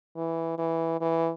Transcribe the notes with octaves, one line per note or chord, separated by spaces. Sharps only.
E3
E3
E3